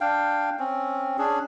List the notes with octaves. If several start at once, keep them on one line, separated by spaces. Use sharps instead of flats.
D4 F5 G5
C4 C#4
C#4 D4 G#4